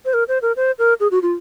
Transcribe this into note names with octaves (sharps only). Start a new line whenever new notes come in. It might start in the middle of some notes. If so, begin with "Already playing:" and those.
C5
A#4
C5
A#4
C5
A#4
G#4
F#4
F4